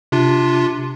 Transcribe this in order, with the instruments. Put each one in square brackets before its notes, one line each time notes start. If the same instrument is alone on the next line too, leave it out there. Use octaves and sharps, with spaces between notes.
[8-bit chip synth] C3 D4 F4